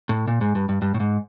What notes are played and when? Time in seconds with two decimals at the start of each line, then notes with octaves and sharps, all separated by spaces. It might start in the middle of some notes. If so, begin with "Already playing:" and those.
0.09 A2
0.28 A#2
0.41 G#2
0.55 G2
0.69 G2
0.82 G2
0.94 A2
1.00 G#2